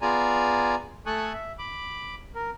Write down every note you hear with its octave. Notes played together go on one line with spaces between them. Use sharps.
B3 F4 G#4 D5 G#5 A#5
A3 A4 G#5 C#6 D#6 F#6
E5
B5 D6
A#4